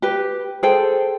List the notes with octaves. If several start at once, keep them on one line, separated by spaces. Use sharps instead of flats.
G4 B4
G#4 A4 C5 G5